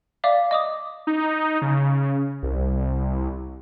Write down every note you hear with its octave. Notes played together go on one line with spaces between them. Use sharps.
D5 E5 F5 D6
D#5 D6 D#6
D#4
C#3
C2